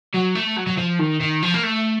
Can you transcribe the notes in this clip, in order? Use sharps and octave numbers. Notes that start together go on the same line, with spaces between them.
F#3
A3
F#3
F#3
F3
D#3
D#3
F3
A#3
A3